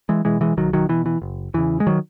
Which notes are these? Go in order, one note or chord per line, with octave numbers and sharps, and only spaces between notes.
E3 G#3
B2 E3 G#3
E3 G#3
B1 D#3 F#3
D#3 F#3
B2 E3
E3
F#1
E2 C#3 E3
G#3
D#3 F#3